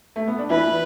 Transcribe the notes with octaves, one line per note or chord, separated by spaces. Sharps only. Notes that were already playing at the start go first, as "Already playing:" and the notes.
A3
B3
D4
E3 E4 B4